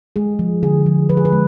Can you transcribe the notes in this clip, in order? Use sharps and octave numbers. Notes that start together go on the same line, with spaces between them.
G#3 G#4
F3
D3 G#4
F3
F3 B4
G#4
B4
G#3